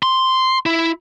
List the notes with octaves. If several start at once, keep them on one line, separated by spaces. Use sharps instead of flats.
C6
E4